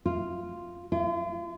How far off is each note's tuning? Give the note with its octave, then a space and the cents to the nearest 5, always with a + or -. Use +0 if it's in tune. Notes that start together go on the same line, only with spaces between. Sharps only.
F4 -5
F4 -40